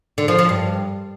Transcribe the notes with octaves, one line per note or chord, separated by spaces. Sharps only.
D3
F3
F3
G2